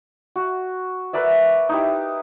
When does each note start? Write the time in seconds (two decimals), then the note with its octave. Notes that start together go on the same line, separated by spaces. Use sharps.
0.36 F#4
1.13 A#4 B4 D5 E5
1.69 D#4 E4 G4